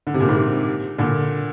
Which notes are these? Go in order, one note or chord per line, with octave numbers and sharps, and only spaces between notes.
D3
C3
A#2
G#2 C3
A#2 D3